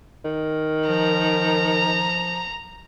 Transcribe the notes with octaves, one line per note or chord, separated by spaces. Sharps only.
D#3
F3 A#5